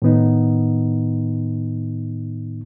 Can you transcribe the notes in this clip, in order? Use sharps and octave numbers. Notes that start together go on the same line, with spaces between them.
A2 D#3 B3 D#4